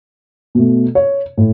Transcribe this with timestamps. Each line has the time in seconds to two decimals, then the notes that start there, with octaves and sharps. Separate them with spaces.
0.55 B2 A3
0.95 C#5
1.37 A2